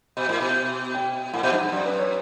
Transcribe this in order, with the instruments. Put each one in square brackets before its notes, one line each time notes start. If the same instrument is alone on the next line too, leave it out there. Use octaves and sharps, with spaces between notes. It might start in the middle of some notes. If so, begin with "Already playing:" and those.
[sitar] B2
A2
B2
[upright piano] G5
[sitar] A2 [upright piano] F#5
[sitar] B2
G2
F#2
G2
[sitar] F#2 [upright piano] D5
[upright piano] B4
C#5